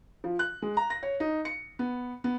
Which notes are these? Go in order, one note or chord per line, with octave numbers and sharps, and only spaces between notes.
F3
F#6
G#3
A#5
A#6
C#5
D#4
C#7
B3
B3